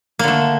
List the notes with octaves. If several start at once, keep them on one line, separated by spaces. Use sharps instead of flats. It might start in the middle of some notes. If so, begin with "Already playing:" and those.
D3 A3 A#3